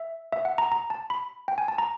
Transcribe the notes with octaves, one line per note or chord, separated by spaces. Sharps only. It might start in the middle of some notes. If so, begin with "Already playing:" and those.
Already playing: E5
E5
F#5
A#5
A#5
A5
B5
G5
G#5
A5
A#5